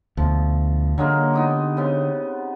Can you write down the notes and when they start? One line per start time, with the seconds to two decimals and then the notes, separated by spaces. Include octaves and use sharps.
0.17 D2 B2 F3
0.98 D3 F#3 G#3 A#3
1.34 B3 D#4 G4
1.77 C#3 B3 C4